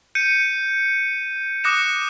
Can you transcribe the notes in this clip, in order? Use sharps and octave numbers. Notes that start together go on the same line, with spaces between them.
G6 C#7 D#7
D6 D#6 F#6 A#6 C#7 E7